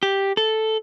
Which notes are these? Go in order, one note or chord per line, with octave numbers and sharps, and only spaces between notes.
G4
A4